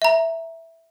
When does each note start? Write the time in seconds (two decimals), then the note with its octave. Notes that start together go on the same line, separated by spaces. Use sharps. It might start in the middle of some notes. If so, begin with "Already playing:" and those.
0.02 E5 A#5